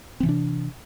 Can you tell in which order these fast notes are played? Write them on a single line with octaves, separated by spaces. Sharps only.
C4 E3 C3 D4